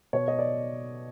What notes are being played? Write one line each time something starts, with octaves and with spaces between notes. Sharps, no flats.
B2 C#5
D#5
D5